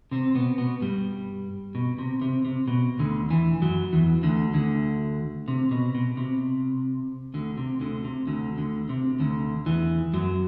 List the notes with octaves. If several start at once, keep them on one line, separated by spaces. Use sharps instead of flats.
C3 C4
B2 B3
B2 B3
G2 G3
B2
C3
C3
C3
B2
D2 D3
E2 E3
F#2 F#3
E2 E3
D2 D3
D2 D3
C3
B2
B2
C3
D2 D3
C3
D2 D3
C3
D2 D3
D2 D3
C3
D2 D3
E2 E3
F#2 F#3